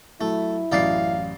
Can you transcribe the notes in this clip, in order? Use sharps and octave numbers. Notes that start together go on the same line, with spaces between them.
F#3 A3 E4
A1 F#2 D#4 D5 F5 C7